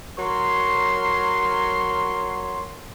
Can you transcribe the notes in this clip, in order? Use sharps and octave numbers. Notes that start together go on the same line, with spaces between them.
F#3 A#4 C#5 C6